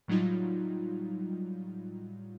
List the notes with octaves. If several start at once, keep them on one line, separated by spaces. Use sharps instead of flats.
A2 F#3 G3 D#4 F4